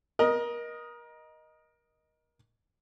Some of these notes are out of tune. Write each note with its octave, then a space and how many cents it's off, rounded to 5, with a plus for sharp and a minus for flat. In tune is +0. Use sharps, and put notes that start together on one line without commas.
A#4 +30 D#5 +0